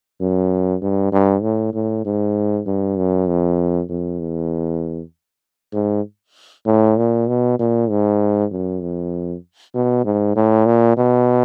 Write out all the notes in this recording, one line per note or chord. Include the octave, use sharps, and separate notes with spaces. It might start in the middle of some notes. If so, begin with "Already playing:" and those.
F#2
G2
G2
A2
A2
G#2
G2
F#2
F2
F2
E2
G#2
A2
A#2
B2
A#2
G#2
F#2
F2
B2
G#2
A2
A#2
B2